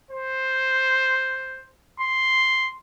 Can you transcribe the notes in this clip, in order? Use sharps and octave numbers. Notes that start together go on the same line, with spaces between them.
C5
C6